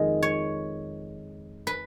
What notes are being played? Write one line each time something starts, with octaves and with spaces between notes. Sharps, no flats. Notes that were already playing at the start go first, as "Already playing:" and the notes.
Already playing: F2 D#3 G#3 D#5
C#5
B4